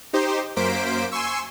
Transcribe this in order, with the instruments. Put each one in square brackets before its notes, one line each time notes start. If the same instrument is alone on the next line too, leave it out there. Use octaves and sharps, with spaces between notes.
[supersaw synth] D#4 G4 C5
F#2 A#3 C5 B6 D7
G#5 C6 C#6 E6